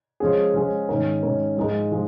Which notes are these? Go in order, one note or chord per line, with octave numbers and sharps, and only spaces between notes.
F3 G#3 C#4 G#4
F3 G#3 C#4 G#4
G#2 D#3 C#4 A#4
G#2 D#3 C#4 A#4
G#2 F3 G#3 D#4 A#4
F3 G#3